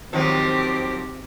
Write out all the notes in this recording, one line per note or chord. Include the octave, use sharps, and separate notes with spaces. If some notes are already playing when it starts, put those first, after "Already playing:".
D#3 F3 F#3 C4 G4